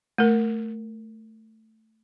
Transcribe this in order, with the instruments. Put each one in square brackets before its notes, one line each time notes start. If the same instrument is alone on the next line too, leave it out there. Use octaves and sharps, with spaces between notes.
[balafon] A3 A#4